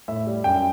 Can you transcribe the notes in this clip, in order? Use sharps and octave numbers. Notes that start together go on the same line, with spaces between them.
A2 E5
G3
F#2 G5